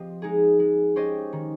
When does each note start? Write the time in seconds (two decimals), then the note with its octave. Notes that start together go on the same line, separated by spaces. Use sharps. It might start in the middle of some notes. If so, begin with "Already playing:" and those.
Already playing: F3 C4 G4 C5 D#5
0.22 G#3 D#4 G#4
0.59 G#3
0.96 C#4 G4 C5 D#5
1.33 D#3